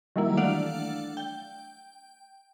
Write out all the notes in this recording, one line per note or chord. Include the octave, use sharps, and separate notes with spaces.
D#3 E3 F#3 G3 A#3 E4
A3 D4 D5 F5 F#5
G5